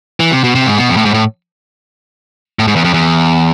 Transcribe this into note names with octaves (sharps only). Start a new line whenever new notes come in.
E3
C3
B2
C3
G#2
B2
F2
A2
G#2
A2
A2
G#2
E2
F2
E2